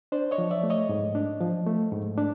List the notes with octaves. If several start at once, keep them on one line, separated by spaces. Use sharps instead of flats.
D4 C5 D5
C#5 D#5
F3
D5 E5
A3
C#5 D#5
G#2
D4
F3
A3
G#2
D4